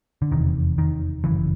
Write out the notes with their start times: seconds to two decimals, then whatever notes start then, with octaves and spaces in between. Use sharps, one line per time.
0.22 D3
0.31 F1 E2 C3 D#3
0.78 D#3
1.24 G1 F#2 C#3 E3